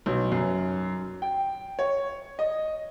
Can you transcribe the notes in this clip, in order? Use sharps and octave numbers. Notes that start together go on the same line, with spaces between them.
B1
F#2
G5
C#5
D#5